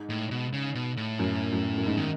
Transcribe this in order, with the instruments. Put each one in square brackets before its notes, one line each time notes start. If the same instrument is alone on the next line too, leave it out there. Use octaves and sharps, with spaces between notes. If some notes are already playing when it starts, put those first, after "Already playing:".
Already playing: [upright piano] G#2
[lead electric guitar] A2
B2
C#3
B2
A2
[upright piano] F#2
F#2
F#2
G#2
[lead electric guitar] D#3